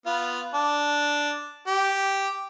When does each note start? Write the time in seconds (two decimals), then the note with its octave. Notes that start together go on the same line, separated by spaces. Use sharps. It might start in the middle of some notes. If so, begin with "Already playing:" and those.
0.06 B3 F4
0.54 D4
1.67 G4